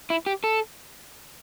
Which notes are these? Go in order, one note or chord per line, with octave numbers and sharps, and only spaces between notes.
E4
G4
A4